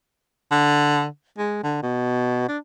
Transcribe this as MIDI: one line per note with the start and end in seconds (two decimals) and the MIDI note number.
0.51 1.06 50
1.38 1.60 56
1.64 1.78 50
1.83 2.48 47
2.49 2.58 62